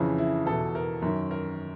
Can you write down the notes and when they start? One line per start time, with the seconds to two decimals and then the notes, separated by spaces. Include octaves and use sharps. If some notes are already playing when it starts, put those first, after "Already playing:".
Already playing: F2 C#3 E3 E4
0.18 E4
0.46 E2 B2 A4
0.75 A#4
1.02 F#2 D#3
1.31 A#4